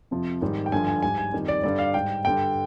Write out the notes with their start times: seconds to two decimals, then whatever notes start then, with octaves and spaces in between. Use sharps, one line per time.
0.11 F2 C3 F3
0.41 G#2 D#3 G3
0.66 G5
0.72 G2 D3 F3 G#5
0.87 G#5
1.02 G#2 G3 G#5
1.18 G#5
1.33 F2 D#3 G3
1.48 D5
1.63 G2 D3 G3 D5
1.79 F5
1.94 G#2 G3 G5
2.24 G2 D3 G3 G5